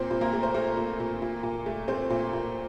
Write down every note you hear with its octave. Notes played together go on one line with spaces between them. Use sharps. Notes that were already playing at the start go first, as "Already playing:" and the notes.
Already playing: A#2 C4 C5
A#2
A#3 A#4
A3
C5
A3 A#3 A#4
A#2
A#2
A#2
A#2
A3
A3 C4 C5
A#2
A#2